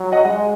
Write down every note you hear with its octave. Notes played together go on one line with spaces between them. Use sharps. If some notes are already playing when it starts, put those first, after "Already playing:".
Already playing: F#3
D#5 F#5
G#3 D#5 F#5